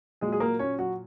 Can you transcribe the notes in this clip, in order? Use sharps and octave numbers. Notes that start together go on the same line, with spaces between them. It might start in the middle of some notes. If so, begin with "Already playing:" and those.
A#2 F#3 G#3 G#4
G#4
A#3 A#4
C#4 C#5
F#3 F#4